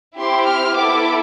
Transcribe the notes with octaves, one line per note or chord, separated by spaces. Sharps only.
C4 E4 G4 C6
F6
B3 E4 A4 D6